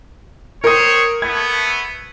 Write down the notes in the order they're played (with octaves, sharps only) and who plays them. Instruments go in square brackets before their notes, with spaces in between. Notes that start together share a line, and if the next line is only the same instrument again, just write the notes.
[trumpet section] C4 C5 C#5 [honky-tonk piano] A#4 D#6
[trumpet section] A3 B3 [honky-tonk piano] G#6